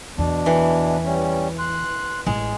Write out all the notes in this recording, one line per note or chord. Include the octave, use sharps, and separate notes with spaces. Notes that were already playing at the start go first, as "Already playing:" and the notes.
E2 B2 D4
E3
G3 C#4
C6 F#6
A1 G#3